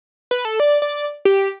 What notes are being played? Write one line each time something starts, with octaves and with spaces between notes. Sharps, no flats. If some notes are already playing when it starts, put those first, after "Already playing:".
B4
A4
D5
D5
G4